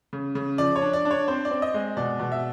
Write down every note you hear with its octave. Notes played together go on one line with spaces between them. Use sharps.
C#3
C#3
F3 D5
C#5
D4
D5
D4
C#5
C4 C5
D5
C4
D#5
G#3
B2 D5
B2
E5